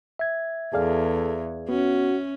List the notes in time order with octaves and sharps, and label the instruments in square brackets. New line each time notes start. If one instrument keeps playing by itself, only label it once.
[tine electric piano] E5 G#6
[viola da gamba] E2 [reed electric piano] G#4 D5 F5 [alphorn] A4
[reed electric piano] B3 [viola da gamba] C#4 [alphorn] F#4